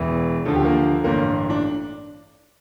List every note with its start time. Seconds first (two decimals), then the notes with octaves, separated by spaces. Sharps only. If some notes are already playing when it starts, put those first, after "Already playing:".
Already playing: E1 E2 E3
0.45 D2 D3 F3 A4
0.55 G4
0.65 A#3
1.04 A1 G2 D3 A#3
1.50 D4